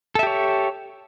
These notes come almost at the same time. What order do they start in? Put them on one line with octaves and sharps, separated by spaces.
A4 E5 G4 C#5